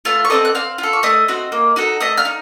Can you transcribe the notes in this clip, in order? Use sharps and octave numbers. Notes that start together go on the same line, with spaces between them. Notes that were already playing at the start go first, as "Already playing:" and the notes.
A3 F4 F5
C#6
C4 D#4 A4 D#5 D#6
F#6
C4 F5 F6
F4
A4
C#6
A3 D#5 D#6
C4 F#4
A#3
D#4 F#4 A4
A3 D#5 D#6
F5 F6
D#4